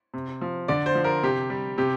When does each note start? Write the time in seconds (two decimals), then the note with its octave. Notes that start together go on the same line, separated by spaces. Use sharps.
0.14 C3
0.41 F3
0.68 D3 D5
0.86 C5
0.95 F3
1.04 A#4
1.23 C3 G4
1.50 G3
1.78 C3 G4